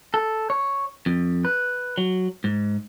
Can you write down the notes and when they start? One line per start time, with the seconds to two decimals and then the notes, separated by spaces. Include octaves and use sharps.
0.14 A4
0.50 C#5
1.06 F2
1.45 B4
1.98 F#3
2.44 G#2